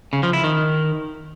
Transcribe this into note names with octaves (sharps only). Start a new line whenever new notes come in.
C#3
F3
E4
D#3